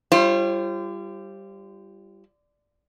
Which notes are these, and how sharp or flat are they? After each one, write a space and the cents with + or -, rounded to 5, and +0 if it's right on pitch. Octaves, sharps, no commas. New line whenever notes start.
G3 +0 F4 -35 C5 +35